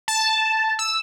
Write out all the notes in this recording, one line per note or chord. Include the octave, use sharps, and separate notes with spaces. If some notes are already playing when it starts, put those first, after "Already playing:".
A5
E6